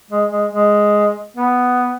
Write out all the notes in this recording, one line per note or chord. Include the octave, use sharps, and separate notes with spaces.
G#3
G#3
G#3
B3